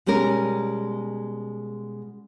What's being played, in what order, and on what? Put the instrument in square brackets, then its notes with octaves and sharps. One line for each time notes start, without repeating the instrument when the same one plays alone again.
[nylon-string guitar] B2 G3 G#3 C#4 A#4